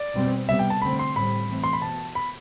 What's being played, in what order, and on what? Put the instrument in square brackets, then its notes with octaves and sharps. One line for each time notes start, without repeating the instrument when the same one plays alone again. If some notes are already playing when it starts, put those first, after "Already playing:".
Already playing: [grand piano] D5
[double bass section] B2 G3 C4
[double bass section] C3 G3 B3 [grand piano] E5
[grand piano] G5
A5
[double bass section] D3 A3 C4 [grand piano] B5
[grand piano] C6
[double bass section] A2 G3 C4 [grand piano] B5
[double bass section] E3 A3 C4
[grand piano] C6
B5
[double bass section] B2 B3 [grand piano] A5
[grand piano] B5